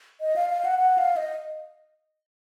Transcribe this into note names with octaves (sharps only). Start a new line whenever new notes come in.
D#5
F5
F5
F#5
F#5
F5
D#5